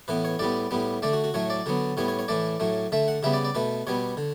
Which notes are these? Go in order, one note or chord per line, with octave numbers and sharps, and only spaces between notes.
A2 E3 B3 B4
C#5
A2 G3 B3 D5
A2 G3 B3
D3 A3 D5
F#4
F#4
A2 F#3 A3 C#5
D5
D3 F#3 B3
A2 G3 B3 C#5
C#5
C#5
A2 E3 A3 D5
A2 F#3 A3
D3 A3 E5
F#5
C#3 G3 B3 E5
D5
D5
B2 A3 B4
B2 G3 B3 C#5
D3